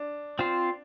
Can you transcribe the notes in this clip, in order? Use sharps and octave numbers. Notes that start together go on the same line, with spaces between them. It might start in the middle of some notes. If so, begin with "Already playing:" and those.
Already playing: D4
C4 F4 C5